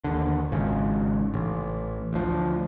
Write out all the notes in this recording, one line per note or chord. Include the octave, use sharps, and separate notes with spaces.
D#2 D3
G#1 G#2 C#3
A1
D2 F3